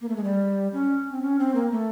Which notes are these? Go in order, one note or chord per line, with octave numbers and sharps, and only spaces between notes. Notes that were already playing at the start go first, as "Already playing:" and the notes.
A#3
A3
G#3
G3
C#4
C4
C#4
C4
A#3
A3